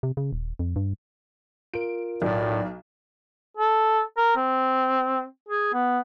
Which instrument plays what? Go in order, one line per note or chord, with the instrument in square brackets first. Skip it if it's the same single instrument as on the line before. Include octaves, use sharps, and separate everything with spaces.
[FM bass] C3
C#3
D#1
F2
G2
[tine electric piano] F4 A#4 [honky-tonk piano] D7
[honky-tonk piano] B1 [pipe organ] A2 [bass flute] D5
[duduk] A4
A#4
C4
G#4
B3